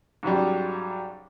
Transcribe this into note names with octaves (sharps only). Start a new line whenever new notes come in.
G#2 C#3 F#3 G3